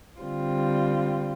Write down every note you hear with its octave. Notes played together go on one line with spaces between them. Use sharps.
D3 G3 C4 F4